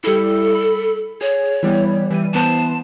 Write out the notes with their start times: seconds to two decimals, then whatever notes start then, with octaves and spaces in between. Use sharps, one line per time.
0.04 G3 E4 A4
0.55 B5
1.21 G#4 C#5
1.63 E3 G3 B3
2.10 E3 G3 D#7
2.34 E3 B3 C5 A5